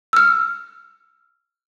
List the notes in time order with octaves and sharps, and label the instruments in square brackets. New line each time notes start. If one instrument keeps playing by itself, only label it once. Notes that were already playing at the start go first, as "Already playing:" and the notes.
[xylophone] E6 F6